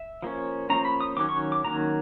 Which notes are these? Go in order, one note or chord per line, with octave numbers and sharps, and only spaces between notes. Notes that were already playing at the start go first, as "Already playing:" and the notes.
Already playing: E5
F3 A#3 C#4
F3 A#3 C#4 A#5
B5
D#6
D#3 F#3 C#4 D6
C#6
D6
D#3 F#3 A#3 C#4 A#5